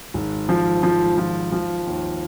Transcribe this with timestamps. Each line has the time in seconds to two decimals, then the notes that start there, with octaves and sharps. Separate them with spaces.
0.14 G#1
0.49 F3
0.83 F3
1.17 F3
1.52 F3
1.87 D#2